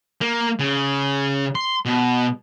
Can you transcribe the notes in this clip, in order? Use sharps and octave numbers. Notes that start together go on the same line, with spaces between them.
A#3
C#3
C6
B2